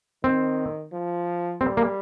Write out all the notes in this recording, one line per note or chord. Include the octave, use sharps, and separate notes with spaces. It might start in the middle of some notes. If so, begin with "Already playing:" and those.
D#3 C4
F3
G3 C4
A#3